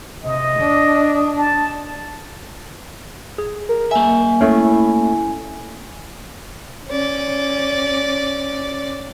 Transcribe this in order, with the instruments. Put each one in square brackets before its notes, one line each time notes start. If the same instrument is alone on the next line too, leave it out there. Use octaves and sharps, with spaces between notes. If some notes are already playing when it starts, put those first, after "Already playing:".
[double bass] C3 [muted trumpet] D#5
[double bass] D4
[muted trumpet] A5
[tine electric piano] G#4
[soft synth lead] A#4
[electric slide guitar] A#3 E5 [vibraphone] G#5
[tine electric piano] A3 C#4 [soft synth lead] E4
[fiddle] C#4 D5